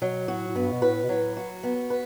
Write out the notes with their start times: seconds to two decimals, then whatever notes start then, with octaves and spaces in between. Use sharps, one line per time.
0.02 B2 F#3
0.28 A2 F#4
0.48 A2
0.55 G2 B3
0.72 B2
0.82 A2 B4
1.04 B2
1.09 A2 F#3
1.37 F#4
1.63 B3
1.90 B4